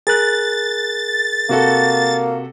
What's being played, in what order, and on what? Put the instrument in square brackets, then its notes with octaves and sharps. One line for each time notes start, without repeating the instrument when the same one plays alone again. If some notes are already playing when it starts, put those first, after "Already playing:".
[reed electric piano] G#4 A#4 F#6 [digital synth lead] A6
[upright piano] C3 F#4 A4 [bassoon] A#3